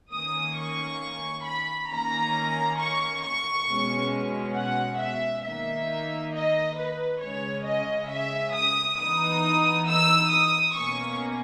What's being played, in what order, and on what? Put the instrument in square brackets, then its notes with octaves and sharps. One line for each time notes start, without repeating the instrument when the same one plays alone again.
[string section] D#3 A#3 C#4 D#6
C#6
B5
D#3 A#3 C#4 A#5
C#6
C#6
B2 G#3 C#4
F#5
E5
D#3 A#3 D#4 E5
D#5
B4
C#3 G#3 C#4 C#5
D#5
E5
D#6
E3 B3 D#4 D#6
E6
D#6
B2 A#3 C#4 C#6